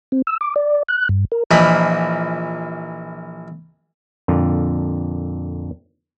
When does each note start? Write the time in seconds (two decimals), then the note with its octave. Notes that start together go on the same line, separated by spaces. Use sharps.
0.12 C4
0.27 E6
0.41 D6
0.56 D5
0.88 F#6
1.09 G2
1.32 A#4
1.51 A#1 E3 F3 A#3 D#5 B5
4.28 F2 A#2 D3